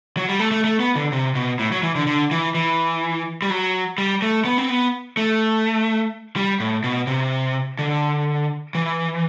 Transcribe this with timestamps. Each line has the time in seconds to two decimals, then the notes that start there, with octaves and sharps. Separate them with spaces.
0.17 F#3
0.29 G3
0.40 A3
0.51 A3
0.64 A3
0.80 B3
0.96 D3
1.12 C3
1.35 B2
1.59 A2
1.72 F#3
1.83 E3
1.95 D3
2.07 D3
2.31 E3
2.55 E3
3.42 G3
3.50 F#3
3.98 G3
4.22 A3
4.45 B3
4.58 C4
4.70 B3
5.17 A3
6.36 G3
6.60 A2
6.84 B2
7.07 C3
7.79 D3
8.75 E3